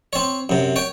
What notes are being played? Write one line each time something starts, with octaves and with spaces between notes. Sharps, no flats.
C4 C#5
F#2 C3
C#5 G5